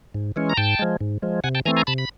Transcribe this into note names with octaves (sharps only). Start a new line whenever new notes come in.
G#2
E3 G#3 C#4
A#5
G#2 G5 A5
F3 G#3
G#2
F3 G#3
C3 F#5 G#5
G5 A5
E3 A3 C4 G#5 A#5
G#5 A#5
C3 A5 B5
B5